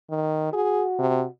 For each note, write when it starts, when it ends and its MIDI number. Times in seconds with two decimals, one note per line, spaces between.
0.10 0.50 51
0.53 1.29 66
0.53 0.84 68
0.99 1.23 48